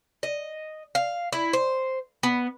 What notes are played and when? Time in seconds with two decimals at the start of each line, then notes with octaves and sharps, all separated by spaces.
0.23 D#5
0.95 F5
1.32 E4
1.53 C5
2.23 B3